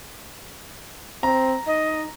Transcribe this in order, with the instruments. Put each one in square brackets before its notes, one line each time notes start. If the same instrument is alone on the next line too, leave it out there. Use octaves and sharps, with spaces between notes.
[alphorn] C4 [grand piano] A#5
[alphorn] D#4 [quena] D#5